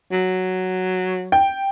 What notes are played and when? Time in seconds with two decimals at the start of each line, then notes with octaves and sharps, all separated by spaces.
0.12 F#3
1.32 G5